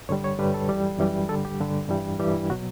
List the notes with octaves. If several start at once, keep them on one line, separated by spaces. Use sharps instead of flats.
G2 D3 G3 C#5
C#5
G2 D3 G3 B4
A4
F#2 E3 G3
F#2 E3 G3
G2 D3 G3 A4
G4
G2 D3 G3
G2 E3 G3
G2 E3 G3 G4
E4
B2 F#3 F#4